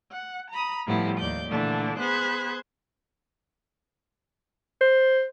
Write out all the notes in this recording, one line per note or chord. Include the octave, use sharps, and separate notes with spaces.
F#5
A#5 B5 D#6
A2 F3 G3 B3 E4
D#2 D5 G6
A#2 D3 E3 A3 D4
B3 G#4 C5 B5 F#6 G#6
C5